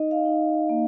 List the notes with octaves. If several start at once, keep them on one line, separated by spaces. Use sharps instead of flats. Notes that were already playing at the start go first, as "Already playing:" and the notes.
Already playing: D#4 D#5
F5
D#4
A#3